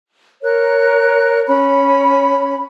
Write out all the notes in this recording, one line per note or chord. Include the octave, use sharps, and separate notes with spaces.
A#4 C#5 F#6
C#4 C#5 B5